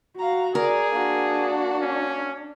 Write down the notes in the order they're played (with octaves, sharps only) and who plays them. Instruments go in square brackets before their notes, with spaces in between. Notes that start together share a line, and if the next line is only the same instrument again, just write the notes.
[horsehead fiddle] F#4 [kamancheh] F5 A#5
[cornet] G#4 [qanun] A#4 [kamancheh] D5
[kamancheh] A#3 F#4 [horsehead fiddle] D4
[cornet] C#4